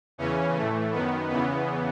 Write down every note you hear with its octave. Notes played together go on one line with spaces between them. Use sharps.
E2 C#3 E3 C#4
A2 E3 A3
F#2 D#3 B3
E2 C#3 E3 B3